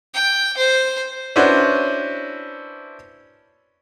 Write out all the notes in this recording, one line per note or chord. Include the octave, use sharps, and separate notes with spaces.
G5
C5
C#4 D4 E4 F#4 B4 C5